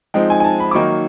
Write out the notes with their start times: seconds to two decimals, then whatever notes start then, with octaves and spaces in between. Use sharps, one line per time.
0.14 F3 G#3 C4 D#4 G5
0.30 G#5
0.40 G#5
0.44 A5
0.60 B5
0.71 D6
0.75 D#3 F#3 A#3 D#4 C#6